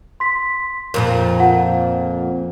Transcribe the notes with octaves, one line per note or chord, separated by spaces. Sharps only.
C6 B6
F2 A#2 F3 A#4
F4 F#5